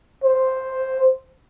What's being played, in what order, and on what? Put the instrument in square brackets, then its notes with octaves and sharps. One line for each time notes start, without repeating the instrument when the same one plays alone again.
[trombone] C5